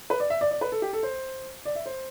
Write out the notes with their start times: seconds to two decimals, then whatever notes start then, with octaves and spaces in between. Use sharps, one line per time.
0.10 B4
0.20 D5
0.30 E5
0.41 D5
0.51 D5
0.61 B4
0.72 A4
0.82 G4
0.93 A4
1.03 C5
1.65 D5
1.76 E5
1.86 C5